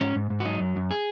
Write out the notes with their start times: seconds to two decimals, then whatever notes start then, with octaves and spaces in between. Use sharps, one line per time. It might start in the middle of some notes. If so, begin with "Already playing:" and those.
0.01 G#2 C#4
0.16 G#2
0.30 G#2
0.40 F#4
0.45 F#3 D#4
0.60 F#2
0.76 F#2
0.91 G#4